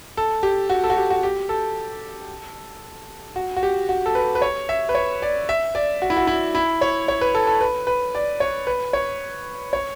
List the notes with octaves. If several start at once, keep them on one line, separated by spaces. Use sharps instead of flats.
A4
G4
F#4
A4
F#4
G4
F#4
G4
A4
F#4
F#4
G4
F#4
A4
B4
B4
C#5
E5
B4
C#5
D5
E5
D5
F#4
E4
F#4
E4
E4
C#5
C#5
B4
A4
A4
B4
B4
D5
C#5
B4
C#5
C#5